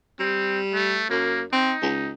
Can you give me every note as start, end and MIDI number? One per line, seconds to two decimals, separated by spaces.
0.20 1.01 55
0.20 0.59 60
0.73 1.07 57
1.10 1.44 42
1.10 1.43 58
1.52 1.73 60
1.52 2.12 63
1.82 2.13 37